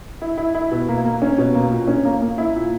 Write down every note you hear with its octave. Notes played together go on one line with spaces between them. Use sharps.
E4
E4
E4
B2
A#3
A#3
C#4
B2
A#3
A#2
C#4
A#3
A#3
E4
A#2